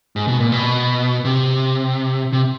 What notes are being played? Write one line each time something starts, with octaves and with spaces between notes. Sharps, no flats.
G#2
B2
A#2
B2
C3
C3